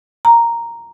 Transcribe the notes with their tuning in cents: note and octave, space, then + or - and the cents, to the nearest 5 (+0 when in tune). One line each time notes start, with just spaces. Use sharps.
A#5 +0